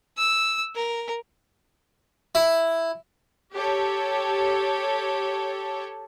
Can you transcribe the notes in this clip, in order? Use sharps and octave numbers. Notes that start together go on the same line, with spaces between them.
E6
A#4
E4
G4 A4 C#5